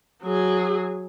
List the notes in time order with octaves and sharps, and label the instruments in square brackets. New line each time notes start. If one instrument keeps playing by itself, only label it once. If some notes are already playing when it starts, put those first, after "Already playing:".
[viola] F#3 G#4